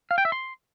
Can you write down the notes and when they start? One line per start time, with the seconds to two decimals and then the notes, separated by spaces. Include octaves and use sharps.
0.11 F5
0.18 G5
0.25 E5
0.32 C6